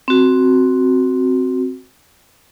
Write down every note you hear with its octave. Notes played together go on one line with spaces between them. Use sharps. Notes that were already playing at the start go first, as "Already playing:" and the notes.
C4 F#4